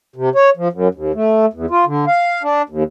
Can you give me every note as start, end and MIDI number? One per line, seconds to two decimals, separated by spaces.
0.16 0.29 48
0.35 0.50 73
0.57 0.68 53
0.73 0.88 42
0.95 1.12 39
1.15 1.46 57
1.53 1.66 40
1.70 1.85 65
1.86 2.05 50
2.07 2.42 77
2.43 2.62 62
2.69 2.83 39